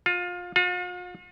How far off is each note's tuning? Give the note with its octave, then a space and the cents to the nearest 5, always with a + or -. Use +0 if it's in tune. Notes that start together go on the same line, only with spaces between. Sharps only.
F4 +25
F4 +45